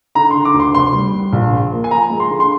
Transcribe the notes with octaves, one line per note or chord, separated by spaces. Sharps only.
D3 A#5
D3 C6
D6
D2
C6
F1 C6
G3
G3
A#1
F3
A#3
G#5
F3 A#5
G#3
C6
D3
C6